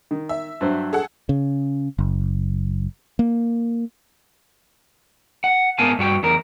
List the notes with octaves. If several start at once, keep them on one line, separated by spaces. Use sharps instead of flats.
D#3
E5
G2 F#3 C5
G#4 A4 F#5
C#3
F#1
A#3
F#5
G#2 B3 A#4 F5 G#5 A5
G2 F#4 G5
E2 A#4